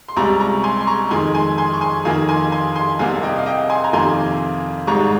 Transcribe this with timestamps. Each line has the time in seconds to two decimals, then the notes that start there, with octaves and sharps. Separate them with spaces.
0.08 C6
0.16 C#2 C3 G3 A#5 C#6
0.40 A#5 C#6
0.64 G#5 C6
0.81 C6
0.87 A#5 C#6
1.11 F2 D#3 G#3 G#5 C6
1.34 G#5 C6
1.58 G#5 C6
1.74 C#6
1.81 G#5 C6
2.05 F2 D#3 A#3 F5 G#5
2.28 G#5 C6
2.52 G#5 C6
2.76 G#5 C6
2.99 C2 C3 G3 A#3 F5 G#5
3.23 D#5 G5
3.38 F5
3.46 D#5 G5
3.70 G#5 C6
3.84 A#5
3.93 F2 C3 D#3 A#3 G#5 C6
4.87 G#1 G#2 G3 A#5 C#6